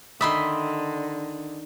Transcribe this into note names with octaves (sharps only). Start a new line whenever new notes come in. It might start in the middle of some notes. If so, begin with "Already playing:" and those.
D3 D#3 D#5 E5 B5 C6